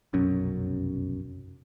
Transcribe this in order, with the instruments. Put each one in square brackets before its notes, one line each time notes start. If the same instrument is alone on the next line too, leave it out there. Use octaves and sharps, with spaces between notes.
[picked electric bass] F1 B1 F#2 C#4